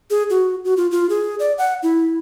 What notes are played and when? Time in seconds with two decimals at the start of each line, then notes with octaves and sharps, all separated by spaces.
0.10 G#4
0.30 F#4
0.65 F#4
0.77 F4
0.91 F4
1.10 G#4
1.39 D5
1.58 F#5
1.83 E4